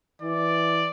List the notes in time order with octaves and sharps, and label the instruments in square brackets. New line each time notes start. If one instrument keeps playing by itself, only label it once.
[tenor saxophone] E3 [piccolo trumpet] D5